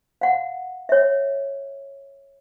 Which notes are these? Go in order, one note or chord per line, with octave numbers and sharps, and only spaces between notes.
F5 F#5
C#5 E5